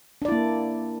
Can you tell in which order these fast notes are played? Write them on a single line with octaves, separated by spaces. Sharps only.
D4 D5 E4 A#3